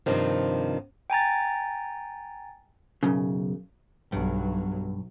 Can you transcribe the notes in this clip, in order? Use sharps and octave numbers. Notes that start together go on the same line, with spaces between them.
G2 C3 D#3 F3
G5 G#5 A#5 A6
B1 F#2 C#3
B1 G2 F#3